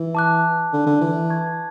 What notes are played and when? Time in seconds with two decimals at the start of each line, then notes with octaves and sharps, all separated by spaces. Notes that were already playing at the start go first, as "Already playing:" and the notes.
Already playing: E3
0.15 A5 D6 F#6
0.73 D3
0.87 D3
1.01 E3
1.29 A5 C#6 G#6